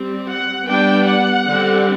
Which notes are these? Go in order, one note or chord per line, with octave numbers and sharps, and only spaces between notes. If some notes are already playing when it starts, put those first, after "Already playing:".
Already playing: G3 C4
F#5
G3 B3 D4 G5
F#5
D3 G3 C4